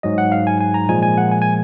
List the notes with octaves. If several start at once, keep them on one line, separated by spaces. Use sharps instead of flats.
G#2 F#3 D#5
F#5
F5
G#5
G#5
A#5
A#2 F3 G#3 G#5
G#5
F#5
G#5
G#5